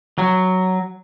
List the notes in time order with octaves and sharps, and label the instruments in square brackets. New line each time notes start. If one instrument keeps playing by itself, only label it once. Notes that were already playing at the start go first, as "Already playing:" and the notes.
[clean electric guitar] F#3